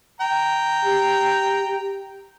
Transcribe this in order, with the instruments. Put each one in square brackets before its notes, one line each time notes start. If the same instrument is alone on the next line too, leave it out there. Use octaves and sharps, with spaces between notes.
[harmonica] G5 A#5
[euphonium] G4